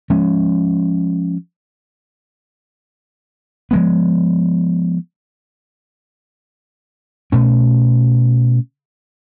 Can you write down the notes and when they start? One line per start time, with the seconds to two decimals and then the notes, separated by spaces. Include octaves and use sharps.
0.10 F3 G#3 C#4
3.71 F3 G#3 B3
7.32 B2 A3 C#4